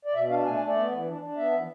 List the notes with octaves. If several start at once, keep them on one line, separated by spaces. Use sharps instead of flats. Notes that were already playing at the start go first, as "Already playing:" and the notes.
D5
B2 E5
D4 F5
A3 G#5
G#5
A3
D5
B3
E3
D4
D4
B3 E5
E3